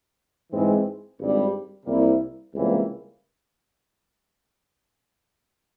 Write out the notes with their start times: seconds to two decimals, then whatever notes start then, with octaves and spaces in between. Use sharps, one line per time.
0.51 G#2 E3 G#3 C4
1.19 G#1 G2 G3
1.86 C2 C3 G3 A#3 E4
2.54 C#2 C3 E3 G3 A#3